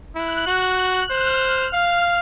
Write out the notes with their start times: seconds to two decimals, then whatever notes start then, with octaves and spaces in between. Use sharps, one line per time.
0.16 E4 F#6
0.47 F#4
1.10 C5 F6
1.41 F6
1.73 F5